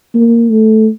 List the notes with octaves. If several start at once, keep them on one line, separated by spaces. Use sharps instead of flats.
A#3
A3